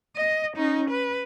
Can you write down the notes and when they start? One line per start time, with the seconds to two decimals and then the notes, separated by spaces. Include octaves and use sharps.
0.16 D#5
0.56 C#4 D#4
0.90 B4